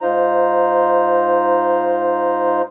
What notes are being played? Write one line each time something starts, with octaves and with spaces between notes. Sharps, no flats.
G#2 D#4 F4 C5 A#5